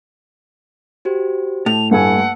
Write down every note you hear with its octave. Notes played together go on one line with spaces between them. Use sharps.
F#4 G4 C5
A2 A5 F7
G2 A3 A#3 F#5 G#5 A5 E6